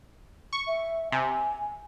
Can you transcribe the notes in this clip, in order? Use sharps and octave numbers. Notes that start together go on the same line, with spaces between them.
C#6
E5
C3 G#5